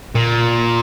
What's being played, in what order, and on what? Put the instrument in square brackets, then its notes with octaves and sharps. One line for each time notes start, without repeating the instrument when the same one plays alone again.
[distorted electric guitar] A#2